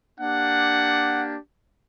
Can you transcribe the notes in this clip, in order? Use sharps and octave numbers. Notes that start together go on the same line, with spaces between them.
A#3 D4 G4 F#5